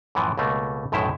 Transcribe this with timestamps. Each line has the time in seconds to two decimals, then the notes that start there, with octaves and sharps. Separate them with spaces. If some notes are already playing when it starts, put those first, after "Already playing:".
0.15 F#2 A2 E3 F3
0.37 C#2 B2 A3 A#3
0.92 B1 F#2 A2 D#3 E4 C5